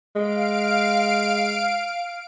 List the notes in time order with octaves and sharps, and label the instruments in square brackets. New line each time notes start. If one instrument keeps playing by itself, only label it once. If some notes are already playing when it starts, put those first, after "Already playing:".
[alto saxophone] G#3 [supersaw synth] F5 D7